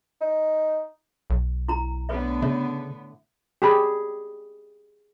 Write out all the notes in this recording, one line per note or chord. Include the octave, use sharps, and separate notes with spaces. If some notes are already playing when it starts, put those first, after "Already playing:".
D#4
B1
E4 A#5
A2 D3 B3 B4 C#5 E5
C#3 C#5 E5
G4 G#4 B5